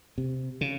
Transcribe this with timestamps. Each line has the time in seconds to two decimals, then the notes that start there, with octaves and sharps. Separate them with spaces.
0.18 C3
0.61 C#3